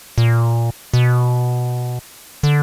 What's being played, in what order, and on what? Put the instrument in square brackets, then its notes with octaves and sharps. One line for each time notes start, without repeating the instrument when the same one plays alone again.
[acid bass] A#2
B2
D3